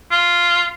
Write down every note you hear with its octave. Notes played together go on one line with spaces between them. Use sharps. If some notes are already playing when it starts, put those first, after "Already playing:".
F4